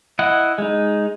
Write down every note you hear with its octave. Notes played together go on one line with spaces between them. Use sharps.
E4 D#5 F#5
G#3 D#4